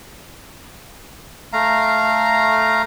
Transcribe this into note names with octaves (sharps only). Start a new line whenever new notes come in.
A3 F5 A#5